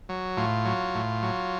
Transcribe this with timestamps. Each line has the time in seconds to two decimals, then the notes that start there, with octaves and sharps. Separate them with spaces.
0.09 F#3
0.37 A2 F4
0.65 F#3
0.95 A2
1.23 F#3